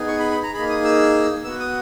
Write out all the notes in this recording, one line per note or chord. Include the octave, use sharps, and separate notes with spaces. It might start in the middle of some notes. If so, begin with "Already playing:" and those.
Already playing: B3 D#4 G#4
C#6
B5
B5
A#5
A#3 D#4 G#4 B5
D#6
E6
B3 F#4 E6
D#6